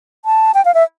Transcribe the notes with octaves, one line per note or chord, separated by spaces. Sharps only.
A5
G5
F5
E5